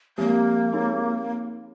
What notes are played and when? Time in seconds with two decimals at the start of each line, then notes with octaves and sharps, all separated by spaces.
0.18 F3 G#3 A#3 C4 G4
0.73 C4 D#4 G#4 C#5